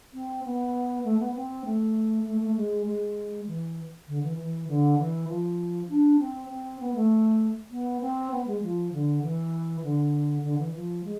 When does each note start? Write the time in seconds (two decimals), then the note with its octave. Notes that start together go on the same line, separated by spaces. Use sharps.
0.14 C4
0.44 B3
1.04 A3
1.19 B3
1.35 C4
1.65 A3
2.26 A3
2.41 A3
2.56 G#3
2.86 G#3
3.47 E3
4.08 D3
4.23 E3
4.38 E3
4.68 D3
4.98 E3
5.28 F3
5.89 D4
6.19 C4
6.50 C4
6.80 B3
6.95 A3
7.71 B3
8.01 C4
8.31 B3
8.47 G#3
8.62 F3
8.93 D3
9.22 E3
9.83 D3
10.44 D3
10.58 E3
10.74 F3
11.04 G#3